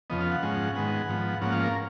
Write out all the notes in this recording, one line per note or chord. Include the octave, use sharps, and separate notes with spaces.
F2 C#3 F3 B3 D#5
F5
F#5
G#2 F3 G#3 C#4
G#2 D#3 G#3 B3 F#5
G#2 F3 B3
G#2 F3 A#3 C#4 F#5
F5
A#4